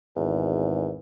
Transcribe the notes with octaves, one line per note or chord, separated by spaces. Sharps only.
G#1 E2